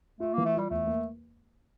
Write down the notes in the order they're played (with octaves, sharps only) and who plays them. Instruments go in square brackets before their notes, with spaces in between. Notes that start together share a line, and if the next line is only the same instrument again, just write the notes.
[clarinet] A3 [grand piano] F4
[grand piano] E3 [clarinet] A#3
[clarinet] A3
[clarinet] G3 [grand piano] F4
[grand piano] E2 [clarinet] A3
[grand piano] A#3